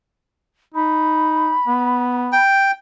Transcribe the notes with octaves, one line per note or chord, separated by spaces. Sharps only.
D#4 B5
B3
G5